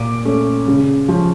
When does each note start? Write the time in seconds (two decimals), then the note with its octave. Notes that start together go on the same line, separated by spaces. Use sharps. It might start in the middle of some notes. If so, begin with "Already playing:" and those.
Already playing: A#2 D6
0.25 A3 C#4
0.68 C#3
1.08 F3 C#4